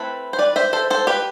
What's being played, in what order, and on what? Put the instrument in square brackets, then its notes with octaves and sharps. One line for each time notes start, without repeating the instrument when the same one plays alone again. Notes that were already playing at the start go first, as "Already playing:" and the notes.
Already playing: [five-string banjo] A3 C4 E4 B4
C5
B4 D5
C5 E5
A4 C5
A4 C5
G4 B4